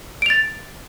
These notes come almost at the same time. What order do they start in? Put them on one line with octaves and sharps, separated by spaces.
D7 F7 A6